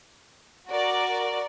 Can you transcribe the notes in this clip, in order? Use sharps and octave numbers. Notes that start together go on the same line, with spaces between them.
F#4 A#4 D5